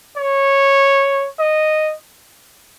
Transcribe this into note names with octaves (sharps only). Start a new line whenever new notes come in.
C#5
D#5